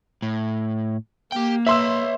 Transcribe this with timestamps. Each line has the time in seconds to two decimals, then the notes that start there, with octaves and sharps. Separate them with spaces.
0.22 A2
1.32 A#3 G4 G5
1.67 B4 C#5 E5 C6 E6